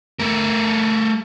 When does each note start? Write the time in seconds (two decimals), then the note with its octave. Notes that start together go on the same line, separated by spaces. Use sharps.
0.20 A3 A#4